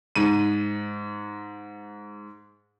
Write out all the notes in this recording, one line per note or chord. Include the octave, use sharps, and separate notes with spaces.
G#2 D#7